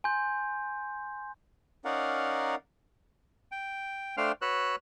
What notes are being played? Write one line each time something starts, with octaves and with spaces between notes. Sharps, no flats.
G#5 C6 G6
C#4 D#4 A#4 D5 F5 F#5
G5
A3 D4 C5 F5 G5 F6
F#4 B4 C#5 E6 F#6